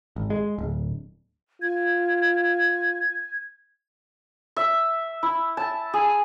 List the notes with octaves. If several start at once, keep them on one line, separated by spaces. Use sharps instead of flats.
G#1
G#3
D1
F4 G#6
E5
E4
A5
G#4